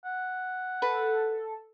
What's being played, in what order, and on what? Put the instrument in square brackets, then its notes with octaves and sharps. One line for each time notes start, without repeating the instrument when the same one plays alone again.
[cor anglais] F#5
[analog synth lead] A4 [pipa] B4